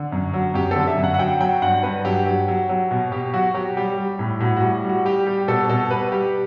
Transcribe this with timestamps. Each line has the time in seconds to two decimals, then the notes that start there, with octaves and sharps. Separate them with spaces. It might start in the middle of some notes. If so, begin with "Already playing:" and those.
Already playing: D3
0.12 F#2
0.34 F#3
0.54 F#2 G4
0.71 D3 A4
0.87 E5
0.98 F#2
1.04 F#5
1.14 F#5
1.19 F#3 G5
1.40 F#3 G5
1.62 G2 F#5
1.83 G2 B4
2.05 F#3 G4
2.26 F#3 G4
2.48 F#3
2.69 F#3
2.91 B2
3.12 B2 G4
3.34 F#3 F#4
3.54 F#3 G4
3.77 G3 G4
3.98 G3
4.19 A2
4.40 A2 F#4
4.57 F#4
4.62 G3
4.84 G3
4.89 F#4
5.05 G3 G4
5.27 G3 G4
5.48 B2 A4
5.69 B2 A4
5.90 G3 B4
6.12 G3 G4